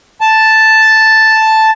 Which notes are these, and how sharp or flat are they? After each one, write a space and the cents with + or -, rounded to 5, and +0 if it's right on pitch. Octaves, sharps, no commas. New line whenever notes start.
A5 +0